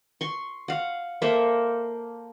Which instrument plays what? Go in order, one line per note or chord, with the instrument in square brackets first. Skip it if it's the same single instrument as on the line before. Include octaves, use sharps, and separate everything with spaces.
[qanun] C6 C#6
F5 F#5
A#3 A4 C5 E5